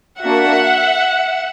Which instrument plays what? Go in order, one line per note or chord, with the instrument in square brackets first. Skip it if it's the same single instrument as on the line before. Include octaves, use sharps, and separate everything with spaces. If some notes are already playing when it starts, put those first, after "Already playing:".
[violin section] A#3 D4 F#4 E5 F#5